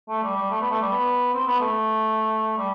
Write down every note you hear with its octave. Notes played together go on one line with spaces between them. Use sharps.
A3
G3
G3
A3
B3
A3
G3
B3
C4
B3
A3
G3